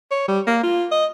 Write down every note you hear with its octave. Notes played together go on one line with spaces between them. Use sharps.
C#5
G3
A#3
F4
D#5